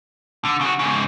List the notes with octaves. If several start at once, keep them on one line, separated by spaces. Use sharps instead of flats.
D3
C#3 F#4
G#2 C#3